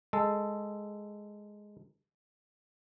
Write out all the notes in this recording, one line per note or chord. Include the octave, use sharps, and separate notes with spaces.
G#3 A4